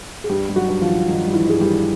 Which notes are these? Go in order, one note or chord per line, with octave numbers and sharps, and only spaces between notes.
G#4
G2 G3 G4
G3
F#3 F#4
G2
F3 F4
D#3
G2 D#3 D#4
G3
E3 E4
G2 G#4
G3 G4
D#3